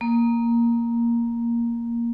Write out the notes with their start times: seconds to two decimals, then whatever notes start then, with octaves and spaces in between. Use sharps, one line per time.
0.01 A#3